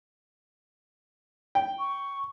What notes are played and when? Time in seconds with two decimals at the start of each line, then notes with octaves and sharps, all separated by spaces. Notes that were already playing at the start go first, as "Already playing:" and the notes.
1.55 G5
1.79 C#6